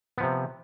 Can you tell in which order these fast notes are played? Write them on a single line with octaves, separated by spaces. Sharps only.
B3 F3 C3